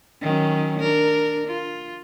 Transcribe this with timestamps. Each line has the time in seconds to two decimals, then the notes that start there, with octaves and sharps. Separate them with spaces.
0.21 D#3 F#3 C#4
0.79 D4 A#4
1.47 F4